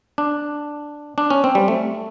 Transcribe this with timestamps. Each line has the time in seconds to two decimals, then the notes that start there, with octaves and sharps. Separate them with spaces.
0.18 D4
1.18 D4
1.30 C#4
1.44 C4
1.55 G3
1.68 A3